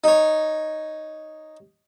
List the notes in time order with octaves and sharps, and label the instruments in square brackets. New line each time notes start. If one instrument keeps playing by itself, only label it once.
[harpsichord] D#4 C#5